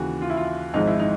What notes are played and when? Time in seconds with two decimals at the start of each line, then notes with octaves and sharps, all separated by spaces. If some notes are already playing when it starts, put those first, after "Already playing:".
Already playing: D#2 C#3 E3 F#4
0.22 F4
0.30 E4
0.37 F4
0.74 G#1 G#2 F3 G#3 D#4
0.87 E4
0.99 D#4